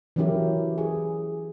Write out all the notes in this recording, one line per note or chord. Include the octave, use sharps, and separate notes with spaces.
E3 F#3 C#4 E4 G4 A#4
G#4